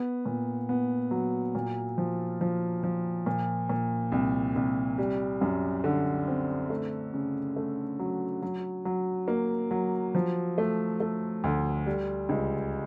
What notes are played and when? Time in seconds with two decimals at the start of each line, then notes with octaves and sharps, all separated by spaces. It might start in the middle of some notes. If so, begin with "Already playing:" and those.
Already playing: B3
0.26 A#2
0.69 B3
1.11 F#3
1.55 A#2
1.98 F3
2.41 F3
2.83 F3
3.26 A#2
3.69 A#2
4.12 C2
4.56 C2
4.98 G3
5.41 F#2
5.84 D3
6.27 C4
6.70 A3
7.13 C#3
7.56 A3
7.99 F#3
8.42 F#3
8.85 F#3
9.28 A#3
9.71 F#3
10.15 F3
10.58 A3
11.00 A3
11.44 D2
11.86 G3
12.29 C#2